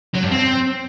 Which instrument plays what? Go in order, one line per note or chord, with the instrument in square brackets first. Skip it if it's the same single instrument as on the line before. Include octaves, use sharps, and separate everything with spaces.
[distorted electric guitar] F#3
G2
C4